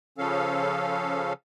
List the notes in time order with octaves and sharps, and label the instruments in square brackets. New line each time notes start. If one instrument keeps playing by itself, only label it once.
[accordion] C#3 F3 C#4 A4 F5